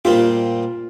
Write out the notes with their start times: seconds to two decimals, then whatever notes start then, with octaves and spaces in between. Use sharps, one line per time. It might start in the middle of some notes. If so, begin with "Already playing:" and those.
0.05 A#2 G3 C4 F4 G4